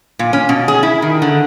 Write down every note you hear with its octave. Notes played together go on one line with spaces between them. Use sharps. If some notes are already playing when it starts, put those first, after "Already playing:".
A#2
C#4
B2
G#4
E4
D#3
D3